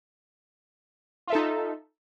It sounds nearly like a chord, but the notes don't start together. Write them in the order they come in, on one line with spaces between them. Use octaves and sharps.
F4 E5 A4 D#4